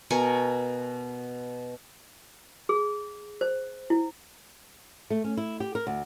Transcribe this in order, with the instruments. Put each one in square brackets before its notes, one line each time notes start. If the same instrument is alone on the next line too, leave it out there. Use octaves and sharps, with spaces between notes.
[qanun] B2 A#4 G#5 C#6
[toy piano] G#4
C5
E4
[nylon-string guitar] A3
C#4
E4
G4
A#4
D2